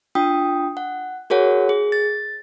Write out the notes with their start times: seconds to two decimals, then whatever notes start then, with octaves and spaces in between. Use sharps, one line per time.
0.15 D4 F4 G5 D#6
0.77 F#5
1.30 F#4 G#4 A#4 C#5 F#5
1.69 G#4
1.92 A6